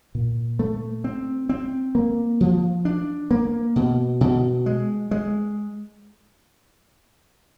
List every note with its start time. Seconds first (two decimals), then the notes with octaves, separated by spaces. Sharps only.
0.15 A#2
0.59 A3
1.04 C4
1.49 C4
1.95 A#3
2.41 F3
2.85 D4
3.31 A#3
3.76 B2
4.21 B2
4.66 G#3
5.11 G#3